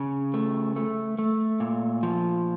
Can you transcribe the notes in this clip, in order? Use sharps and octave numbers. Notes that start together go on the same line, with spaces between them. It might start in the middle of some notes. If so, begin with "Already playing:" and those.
Already playing: C#3
A3
A3
A3
A#2
F3